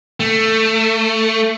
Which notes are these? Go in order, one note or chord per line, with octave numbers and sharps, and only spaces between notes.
A3